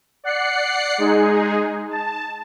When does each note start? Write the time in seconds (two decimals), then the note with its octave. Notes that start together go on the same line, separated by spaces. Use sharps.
0.24 D5 F#5 F#6 C7 C#7
0.98 G#3 D#4 G#4
1.91 A5